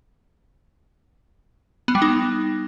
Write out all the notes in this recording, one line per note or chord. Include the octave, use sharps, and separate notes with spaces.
B3
G3
D#4